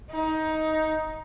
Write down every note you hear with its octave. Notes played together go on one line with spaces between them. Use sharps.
D#4